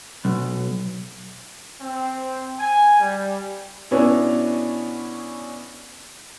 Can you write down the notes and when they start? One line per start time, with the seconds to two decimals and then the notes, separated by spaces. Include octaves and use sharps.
0.25 B1
1.81 C4
2.59 G#5
3.00 G3
3.91 B2 B3 C#4 D4 E4